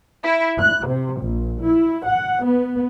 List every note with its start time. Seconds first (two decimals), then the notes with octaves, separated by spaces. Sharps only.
0.23 E4
0.58 F#6
0.88 C3
1.21 A#1
1.61 E4
2.07 F#5
2.44 B3